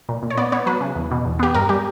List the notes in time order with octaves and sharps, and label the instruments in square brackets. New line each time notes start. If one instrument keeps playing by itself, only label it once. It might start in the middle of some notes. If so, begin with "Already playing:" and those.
[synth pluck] A#2
A#2
C#5
B3 D5
B3 C#5
F#3 B4
C#3
E2
B2
E2
B3 G4
G2 A#4
G3 G4